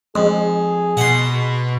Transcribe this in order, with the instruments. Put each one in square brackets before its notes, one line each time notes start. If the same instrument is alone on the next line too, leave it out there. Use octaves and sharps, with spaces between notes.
[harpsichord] F2 [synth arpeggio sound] G#3 [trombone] G#4
[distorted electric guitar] B2 [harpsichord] F#5 C6